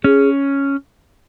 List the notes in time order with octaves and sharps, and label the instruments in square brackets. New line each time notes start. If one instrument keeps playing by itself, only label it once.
[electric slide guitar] C#4 [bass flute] G#4